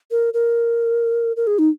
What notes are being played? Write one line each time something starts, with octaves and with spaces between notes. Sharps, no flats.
A#4
A#4
A#4
G#4
D#4